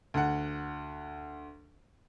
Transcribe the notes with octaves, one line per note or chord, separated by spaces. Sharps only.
D2 F#5